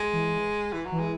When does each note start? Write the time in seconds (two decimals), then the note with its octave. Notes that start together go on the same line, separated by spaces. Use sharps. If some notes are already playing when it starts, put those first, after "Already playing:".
Already playing: G#3
0.13 E3
0.73 E3
0.86 F#3
0.92 E3
0.99 G#3